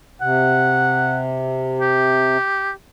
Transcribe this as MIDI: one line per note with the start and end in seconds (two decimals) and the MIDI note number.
0.21 2.37 48
0.21 1.18 78
1.81 2.71 67